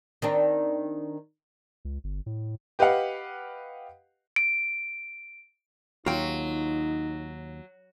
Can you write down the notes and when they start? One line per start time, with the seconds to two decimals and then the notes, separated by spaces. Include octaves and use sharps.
0.22 D#3 C4 D4
1.85 C#2
2.04 G1
2.26 A2
2.79 G4 B4 D#5 F5 F#5
4.36 D7
6.06 D#2 F#3 D#4 F4 G5